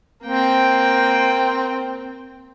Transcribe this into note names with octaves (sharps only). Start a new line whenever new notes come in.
A#3 C4 G5